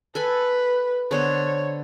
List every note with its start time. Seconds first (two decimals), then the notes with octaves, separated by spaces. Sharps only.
0.15 A4 B4 G#5 B5
1.11 D3 B3 C5 C#5